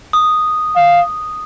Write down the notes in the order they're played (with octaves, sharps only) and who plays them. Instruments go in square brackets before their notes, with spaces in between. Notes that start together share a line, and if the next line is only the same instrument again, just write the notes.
[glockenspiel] D#6
[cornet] F5